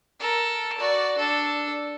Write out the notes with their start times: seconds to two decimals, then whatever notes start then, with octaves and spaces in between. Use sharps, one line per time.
0.20 A4 A#4
0.78 F#4 D5
1.18 D4 A4